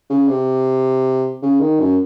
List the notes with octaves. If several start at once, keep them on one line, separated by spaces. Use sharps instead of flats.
C#3
C3
C#3
D#3
F#2